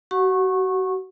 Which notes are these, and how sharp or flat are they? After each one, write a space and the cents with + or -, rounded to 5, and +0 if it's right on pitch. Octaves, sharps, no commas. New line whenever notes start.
F#4 +35 F#5 -20 C#6 -20